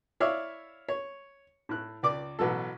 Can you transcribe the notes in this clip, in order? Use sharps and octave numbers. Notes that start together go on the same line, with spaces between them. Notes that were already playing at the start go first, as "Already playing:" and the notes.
E4 C#5 D5 E5 F5
C#5
A2 F#6
C#2 D5 D6
A1 B2 F#3 A4